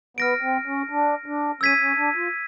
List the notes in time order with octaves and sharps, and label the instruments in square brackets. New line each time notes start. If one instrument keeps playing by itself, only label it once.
[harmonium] B3 [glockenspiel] F6 A#6 D7
[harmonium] C4
C#4
D4
D4
[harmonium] C#4 [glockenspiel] E6 G#6 B6 D#7
[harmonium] C#4
D4
F4